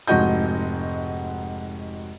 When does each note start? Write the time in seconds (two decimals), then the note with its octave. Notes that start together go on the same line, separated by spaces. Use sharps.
0.07 F1 G#2 F#4 D#5 G6